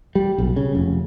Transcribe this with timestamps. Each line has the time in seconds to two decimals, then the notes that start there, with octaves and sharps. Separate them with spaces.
0.15 G3
0.38 B1
0.56 C#3
0.75 F1